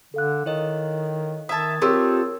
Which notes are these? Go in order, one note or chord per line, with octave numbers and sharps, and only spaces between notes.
D3 A4 F5 F#6
D#3 E4 C#5 D#5
D#3 E5 A5 D#6 G#6 A6
A3 C4 F4 G4 A#4 C#5 E6